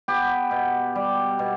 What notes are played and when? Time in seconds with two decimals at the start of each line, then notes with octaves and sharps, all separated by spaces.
0.08 B3 G4
0.51 B2
0.95 G3
1.39 B2